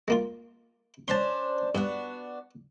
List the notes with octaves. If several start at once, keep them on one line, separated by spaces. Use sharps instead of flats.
G#3 A#3 F4
C#4 D4 C5 A5 C6
G2 B3 D4 F#4